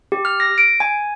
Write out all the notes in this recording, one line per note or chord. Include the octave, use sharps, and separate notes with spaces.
G4
F6
A#6
D7
G#5